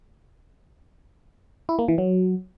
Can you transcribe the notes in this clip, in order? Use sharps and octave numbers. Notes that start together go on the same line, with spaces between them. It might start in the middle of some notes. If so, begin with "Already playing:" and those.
E4
A#3
E3
F#3